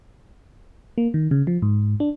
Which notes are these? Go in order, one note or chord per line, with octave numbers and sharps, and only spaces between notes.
A#3
D#3
C#3
F3
G#2
D4